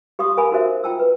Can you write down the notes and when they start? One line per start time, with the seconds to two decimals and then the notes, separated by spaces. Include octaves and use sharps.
0.19 G4 F5 C6 C#6 D#6
0.37 A#4 F5 F#5 G#5 A5 B5
0.52 D#4 F#4 A#4 C5 E5 F5
0.84 E4 F4 G5 A5 E6
1.00 B4